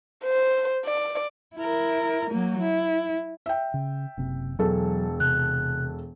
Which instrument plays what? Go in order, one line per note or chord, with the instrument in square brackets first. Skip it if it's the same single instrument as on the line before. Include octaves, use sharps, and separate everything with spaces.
[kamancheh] C5
D5
[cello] E4 A#4
F#3 A#3
E4
[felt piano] E5 G5
[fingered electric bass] C#3
F#1 C3
[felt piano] E1 A4 [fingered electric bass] F#3
[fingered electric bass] C3 [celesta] F#6